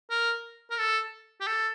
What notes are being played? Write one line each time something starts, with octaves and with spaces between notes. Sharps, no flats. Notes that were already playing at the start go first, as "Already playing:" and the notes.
A#4
A#4
A4
G4
A4